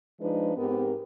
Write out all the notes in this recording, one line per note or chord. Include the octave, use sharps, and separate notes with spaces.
F3 G#3 D4 D#4 B4
G#2 B3 C4 G4 A#4